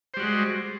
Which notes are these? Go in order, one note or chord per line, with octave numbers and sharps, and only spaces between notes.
G3 G#3 F#4 C5